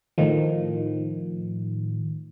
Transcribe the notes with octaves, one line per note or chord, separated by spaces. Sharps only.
A2 D#3 F3